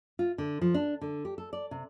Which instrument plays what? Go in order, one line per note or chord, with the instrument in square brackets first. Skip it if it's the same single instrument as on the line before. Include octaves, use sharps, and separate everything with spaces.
[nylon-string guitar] F4
D3
F3
D4
D3
G4
A4
D5
C3